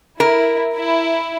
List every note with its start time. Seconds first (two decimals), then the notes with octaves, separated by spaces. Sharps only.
0.20 E4 A#4
0.74 E4